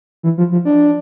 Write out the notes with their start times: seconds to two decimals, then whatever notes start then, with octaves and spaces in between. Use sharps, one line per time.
0.23 E3
0.38 F3
0.52 F3
0.65 D4